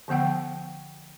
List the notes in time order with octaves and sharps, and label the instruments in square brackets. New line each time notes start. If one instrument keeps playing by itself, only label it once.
[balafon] D3 F3 B3 F#5 G5